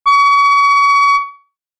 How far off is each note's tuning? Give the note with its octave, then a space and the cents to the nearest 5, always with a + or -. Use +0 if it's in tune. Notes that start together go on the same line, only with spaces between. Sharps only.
C#6 +35